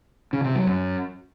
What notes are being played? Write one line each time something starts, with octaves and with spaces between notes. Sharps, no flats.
C#3
C3
F#3
F#2